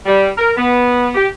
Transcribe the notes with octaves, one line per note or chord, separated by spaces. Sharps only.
G3
A#4
B3
G4